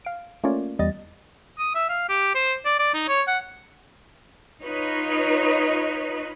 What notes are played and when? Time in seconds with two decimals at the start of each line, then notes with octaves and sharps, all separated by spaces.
0.05 F5 D7
0.44 A3 A#3 C#4 F4 C#5 D5
0.79 E2 G3 D#5 A6
1.59 D#6
1.75 E5
1.89 F5
2.09 G4
2.35 C5
2.65 D5
2.79 D5
2.94 D#4
3.08 C#5
3.27 F#5
4.61 D#4 F4 B4 C#5 D#5